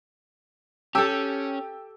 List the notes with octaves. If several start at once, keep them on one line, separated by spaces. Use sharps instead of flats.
C#4 G4 A4 G5 E6